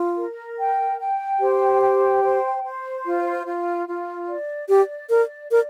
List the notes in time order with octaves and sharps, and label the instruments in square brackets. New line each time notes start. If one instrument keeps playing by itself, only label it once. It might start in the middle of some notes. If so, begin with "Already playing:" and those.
Already playing: [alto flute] F4
[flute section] A#4
G5
G5
[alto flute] G4 [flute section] C5
[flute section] G5
C5
C5
F4
F4
F4
D5
[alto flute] G4 [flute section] D5
[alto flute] A#4 [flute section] D5
[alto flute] A#4 [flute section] D5